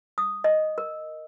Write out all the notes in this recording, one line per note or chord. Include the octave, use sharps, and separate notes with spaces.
D#6
D#5
A#4